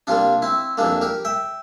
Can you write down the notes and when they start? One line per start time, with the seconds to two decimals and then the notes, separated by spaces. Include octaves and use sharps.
0.07 C3 G3 A#3 D4 F4
0.42 C4 E4
0.77 F2 E3 G3 A#3 D4
1.01 G4 A#4
1.25 E5 G5